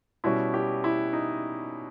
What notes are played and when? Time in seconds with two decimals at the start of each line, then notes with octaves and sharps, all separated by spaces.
0.24 B2 G3 C#4 E4
0.54 G4
0.84 E4
1.13 D#4